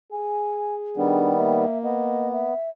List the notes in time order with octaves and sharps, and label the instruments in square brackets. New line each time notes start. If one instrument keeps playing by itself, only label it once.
[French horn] G#4 [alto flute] G#5
[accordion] D#3 G3 B3 [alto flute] D4
[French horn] A#3 [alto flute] E5
[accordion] B3 [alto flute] D#5
[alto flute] E5